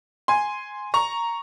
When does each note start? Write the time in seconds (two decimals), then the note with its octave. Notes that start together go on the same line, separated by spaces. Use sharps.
0.28 G#5 C6
0.94 A#5 C#6